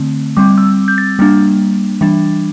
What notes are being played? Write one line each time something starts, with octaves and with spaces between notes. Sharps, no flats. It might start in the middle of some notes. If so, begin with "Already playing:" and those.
Already playing: D3 A3 C4
G3 C4 D6
E6
G6
A6
G3 A#3 D4
E3 G3 D4